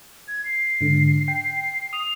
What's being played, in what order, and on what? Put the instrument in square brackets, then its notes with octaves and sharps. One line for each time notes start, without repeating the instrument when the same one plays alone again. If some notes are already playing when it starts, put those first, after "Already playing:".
[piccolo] G#6
C7
[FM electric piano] G#2 D3
G5
[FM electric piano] D#6 [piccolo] F7